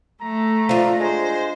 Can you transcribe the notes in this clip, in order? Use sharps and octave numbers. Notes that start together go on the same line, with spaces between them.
A3 A#5
F3 D4 F4
G#3 C5